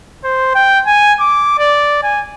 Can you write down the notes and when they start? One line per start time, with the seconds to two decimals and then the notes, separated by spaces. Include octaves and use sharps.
0.24 C5
0.55 G5
0.87 G#5
1.20 D6
1.59 D5
2.03 G#5